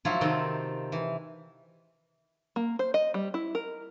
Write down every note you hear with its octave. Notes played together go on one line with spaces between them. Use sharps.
F3 F#3 E4 F4
C3 D#3 C4 A4 G5
E3
A#3
C5
D#5
G3
E4
A#4